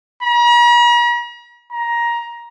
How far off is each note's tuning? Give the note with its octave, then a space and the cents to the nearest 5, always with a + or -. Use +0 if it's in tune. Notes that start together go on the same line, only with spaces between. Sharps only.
A#5 +45
A#5 +15